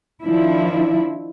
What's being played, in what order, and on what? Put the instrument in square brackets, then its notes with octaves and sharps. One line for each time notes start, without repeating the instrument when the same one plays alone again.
[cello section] D#3 F3 D4 E4